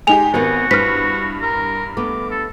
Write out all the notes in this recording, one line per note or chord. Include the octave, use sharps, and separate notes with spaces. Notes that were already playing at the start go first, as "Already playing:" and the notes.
G#3 D#4 G4 G#5 F7
G#1 B3 F#4 A#4 B4
G2 E4 B4 C5 F6 B6
A#4
A3 B3 D6
A4